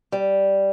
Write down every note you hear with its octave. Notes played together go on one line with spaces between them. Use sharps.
G3